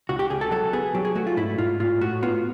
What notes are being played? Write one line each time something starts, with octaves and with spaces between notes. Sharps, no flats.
C#2 F#4
G4
C#2 G#4
A4
F#3 A4
B3 G#4
F#3 G4
G#4
A3 F#4
F4
G#2 E4
G#2 F4
A2 F4
A2 F#4
B3 F4